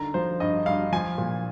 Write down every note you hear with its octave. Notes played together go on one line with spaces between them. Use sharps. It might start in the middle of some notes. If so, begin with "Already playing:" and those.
Already playing: D3 D#3 A#5
F3 C5
G2 D#5
G2 F5
F3 G#5
A#2